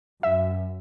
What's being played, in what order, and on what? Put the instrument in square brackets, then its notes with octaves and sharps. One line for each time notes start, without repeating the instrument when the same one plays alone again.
[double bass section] F#2 [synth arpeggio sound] E5